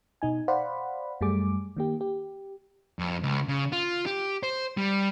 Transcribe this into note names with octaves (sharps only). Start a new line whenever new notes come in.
B2 D#4 G#5
C5 D5 F5 F#5 B5
F#2 G3 A3 G#4 D6
D#3 A#3 G4
G4
F2
C#2
C#3
F4
G4
C5
G3